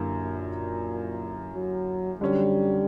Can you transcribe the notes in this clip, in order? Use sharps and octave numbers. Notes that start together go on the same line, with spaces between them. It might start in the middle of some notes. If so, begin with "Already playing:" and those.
Already playing: F#2 D3 A#3 E4 G4
A#2
F#3
D3 F#3 G3 C#4